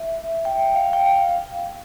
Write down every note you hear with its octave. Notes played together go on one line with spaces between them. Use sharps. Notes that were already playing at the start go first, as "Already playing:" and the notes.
Already playing: E5
G5
F5
G5
F5